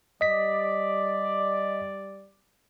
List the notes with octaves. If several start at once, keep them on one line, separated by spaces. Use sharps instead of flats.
G3 D5 D#5 B6